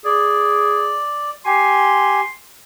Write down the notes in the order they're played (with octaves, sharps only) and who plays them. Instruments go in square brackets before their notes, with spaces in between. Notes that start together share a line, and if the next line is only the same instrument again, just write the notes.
[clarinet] G#4 [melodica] D5
[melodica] G4 G#5 [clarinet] C6